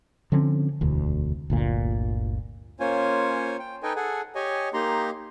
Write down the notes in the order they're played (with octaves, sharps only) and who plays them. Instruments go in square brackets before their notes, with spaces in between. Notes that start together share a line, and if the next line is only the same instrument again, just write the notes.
[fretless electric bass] D3 F3 C4 C#4
E1 D2
G1 D2 A#2
[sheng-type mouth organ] A#3 C#4 F4 C5 C#5 G#5
G5
D#4 A4 B4 D#5 G5 G#5
G#4 A4 F#5 G#5
G4 C#5 D#5 G#5
A#3 D#4 G4 A#5 C6